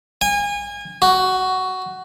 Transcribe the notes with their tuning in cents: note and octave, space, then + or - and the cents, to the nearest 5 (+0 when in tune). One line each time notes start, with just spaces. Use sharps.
G#5 -30
F#4 +10